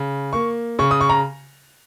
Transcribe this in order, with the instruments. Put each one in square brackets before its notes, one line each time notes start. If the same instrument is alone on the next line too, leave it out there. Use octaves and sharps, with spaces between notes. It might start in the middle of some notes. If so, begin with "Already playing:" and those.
Already playing: [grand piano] C#3
A#3 C#6
C#3 C#6
D#6
C#6
A#5